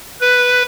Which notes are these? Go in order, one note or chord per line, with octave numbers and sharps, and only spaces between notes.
B4